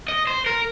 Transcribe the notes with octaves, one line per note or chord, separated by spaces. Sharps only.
D#5
C5
A#4